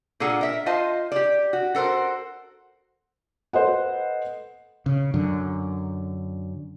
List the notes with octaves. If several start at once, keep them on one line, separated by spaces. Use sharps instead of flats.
A#2 D4 G#4 A4 F#5
A#4 E5
F4 C5 D#5 F5 A5
G4 D5
F#4
F#4 A4 A#4 C5
A4 B4 C5 D#5 F#5
C#3
F#2 D3